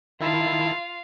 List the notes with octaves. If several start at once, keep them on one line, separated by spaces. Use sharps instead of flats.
D#3 E4 F4 F5 A5